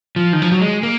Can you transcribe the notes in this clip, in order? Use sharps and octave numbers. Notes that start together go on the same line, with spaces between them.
F3
D#3
F3
F#3
G#3
A#3